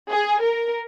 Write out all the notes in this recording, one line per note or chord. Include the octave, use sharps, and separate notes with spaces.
G#4
A#4